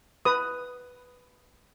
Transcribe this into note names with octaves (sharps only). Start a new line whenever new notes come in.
B4 D#6